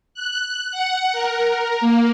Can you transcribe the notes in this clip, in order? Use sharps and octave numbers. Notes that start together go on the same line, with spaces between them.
F#6
F#5
A#4
A#3